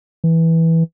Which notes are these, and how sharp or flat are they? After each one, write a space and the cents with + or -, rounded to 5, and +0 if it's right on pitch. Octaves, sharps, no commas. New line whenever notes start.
E3 -10